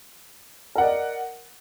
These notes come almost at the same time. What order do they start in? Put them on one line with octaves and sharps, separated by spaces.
A#4 F#5 D5 D#5